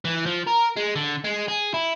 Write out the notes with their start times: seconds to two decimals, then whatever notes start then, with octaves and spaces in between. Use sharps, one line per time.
0.05 E3
0.26 F3
0.47 A#4
0.76 G#3
0.95 D3
1.24 G#3
1.48 G#4
1.74 E4